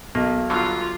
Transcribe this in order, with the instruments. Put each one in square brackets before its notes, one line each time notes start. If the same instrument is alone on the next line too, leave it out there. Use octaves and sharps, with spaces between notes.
[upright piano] B1 [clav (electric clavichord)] A#3
[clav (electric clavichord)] D3 F#3 G3 [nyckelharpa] F4